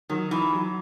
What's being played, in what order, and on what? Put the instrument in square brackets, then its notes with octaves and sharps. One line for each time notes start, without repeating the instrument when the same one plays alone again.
[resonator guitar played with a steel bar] D#3 [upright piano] F#3
[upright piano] D#3 [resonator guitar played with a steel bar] E3
[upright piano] F#3